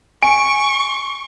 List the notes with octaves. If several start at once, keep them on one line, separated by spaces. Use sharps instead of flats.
G#5 C#6 D7